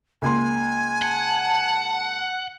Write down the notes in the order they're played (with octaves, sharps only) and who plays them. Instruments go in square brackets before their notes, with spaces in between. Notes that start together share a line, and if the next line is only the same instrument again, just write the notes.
[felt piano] C#2 A#3 C6 [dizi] G#5
[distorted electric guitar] F#5 [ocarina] A5